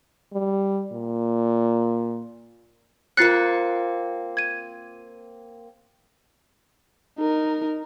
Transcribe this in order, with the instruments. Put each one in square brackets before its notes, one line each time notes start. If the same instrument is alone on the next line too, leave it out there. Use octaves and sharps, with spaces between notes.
[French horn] G3
A#2
[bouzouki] A#3 C4 [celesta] F4 A6 C#7 [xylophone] F#6 C7
[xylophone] G#6 D#7
[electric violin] D#4 A#4